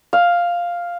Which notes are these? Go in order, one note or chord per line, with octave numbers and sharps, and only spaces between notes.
F5